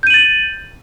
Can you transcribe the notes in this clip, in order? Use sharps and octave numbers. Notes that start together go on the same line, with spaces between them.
G6 A6 D#7 F#7